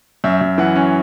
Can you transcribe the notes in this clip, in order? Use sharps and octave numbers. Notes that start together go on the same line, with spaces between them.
F#2 E5
F#2
E3 F#5
C#4